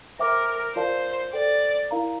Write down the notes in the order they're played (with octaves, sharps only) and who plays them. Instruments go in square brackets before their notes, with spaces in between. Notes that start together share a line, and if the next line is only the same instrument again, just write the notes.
[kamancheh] A#4 [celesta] C5 E5 G5 D6
[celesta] F4 A#4 D5 F5 A5 [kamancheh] C5
[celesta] A4 C5 G5 [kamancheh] D5
[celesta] E4 A#4 F5 A#5